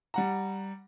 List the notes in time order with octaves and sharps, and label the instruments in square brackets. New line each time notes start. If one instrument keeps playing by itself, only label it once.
[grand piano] G3 F#5 A#5